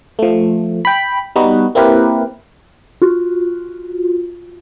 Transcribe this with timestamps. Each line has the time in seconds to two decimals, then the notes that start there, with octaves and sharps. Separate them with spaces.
0.19 F3 A3
0.85 G5 B5
1.36 G3 B3 D#4 F#4 B4
1.75 A#3 C4 E4 G4 A#4 B4
3.02 F4 F#4